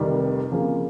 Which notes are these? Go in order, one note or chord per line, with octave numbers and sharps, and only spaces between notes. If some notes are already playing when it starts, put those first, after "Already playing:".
Already playing: F1 F2 C3 D#3 G3
F2 C#3 F3 A#3